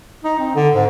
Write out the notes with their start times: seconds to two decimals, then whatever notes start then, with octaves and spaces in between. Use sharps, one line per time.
0.24 D#4
0.40 C4
0.55 D3
0.74 G#2